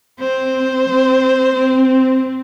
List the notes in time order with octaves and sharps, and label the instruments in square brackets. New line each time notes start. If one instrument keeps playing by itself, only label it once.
[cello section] C4 [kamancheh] C5
[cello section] C4
C4